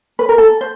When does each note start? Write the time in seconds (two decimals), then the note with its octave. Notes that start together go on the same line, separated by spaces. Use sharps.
0.19 B4
0.29 A#4
0.38 A4
0.61 C5